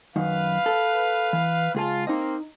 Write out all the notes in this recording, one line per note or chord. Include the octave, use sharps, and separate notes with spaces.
F#2 D#3 B4 F5
A4
E3
C#2 F4 G#4 A5
A#3 C4 D#4 D#5